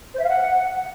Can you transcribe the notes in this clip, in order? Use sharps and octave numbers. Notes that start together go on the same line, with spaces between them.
C5
E5
F5
F#5